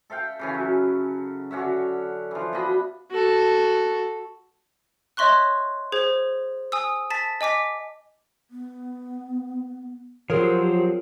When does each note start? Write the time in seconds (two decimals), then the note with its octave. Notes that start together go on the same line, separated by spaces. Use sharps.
0.10 A4 E5 F5 G5
0.39 C#3 E3 C#4
0.54 F#3
1.51 D3 C#4 F#4 E5
2.31 E3 F3
2.53 B2 D4 D#5 B5
3.11 F#4 A4
5.17 C#5 D#5 E5 C6 C#6 F#6
5.92 G#4 C5 G#6
6.72 G#5 D#6 E6
7.10 A5 A6 B6
7.41 D#5 G#5 D6 B6
8.51 B3
10.30 F3 F#3 C4 F4 G4 G#4 A#4 C#5